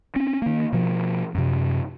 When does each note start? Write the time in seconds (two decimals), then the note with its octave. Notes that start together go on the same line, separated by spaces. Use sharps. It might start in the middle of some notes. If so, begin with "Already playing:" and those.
0.16 C4 C#4
0.42 D#3 A#3
0.72 B2 F3
1.35 F#2 C3